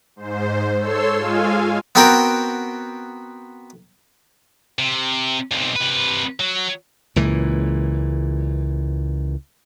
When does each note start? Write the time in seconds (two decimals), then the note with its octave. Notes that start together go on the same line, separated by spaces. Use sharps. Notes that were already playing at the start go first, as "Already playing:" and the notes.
0.16 G#2 C5
0.77 A4 C#5 C6 E6
1.16 G#3 F4 F5 G#5
1.95 B3 C4 F#4 A#4 G5
4.79 C3
5.51 B1 C3
5.76 C3 B4
6.40 F#3
7.16 C#2 A#2 E3